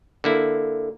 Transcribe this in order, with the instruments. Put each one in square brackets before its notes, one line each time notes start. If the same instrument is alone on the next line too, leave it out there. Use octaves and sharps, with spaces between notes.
[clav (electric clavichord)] D3 A#3 E4